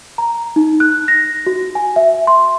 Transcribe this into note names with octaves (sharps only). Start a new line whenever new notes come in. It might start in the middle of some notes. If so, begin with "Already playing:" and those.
A#5
D#4
F#6
A#6
F#4
G#5
E5
C6